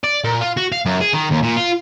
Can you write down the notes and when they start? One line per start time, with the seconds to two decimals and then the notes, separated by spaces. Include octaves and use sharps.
0.04 D5
0.24 A#2
0.41 F4
0.57 F#4
0.72 F5
0.86 F#2
1.01 G#4
1.13 D#3
1.31 D#2
1.43 A#2
1.57 F4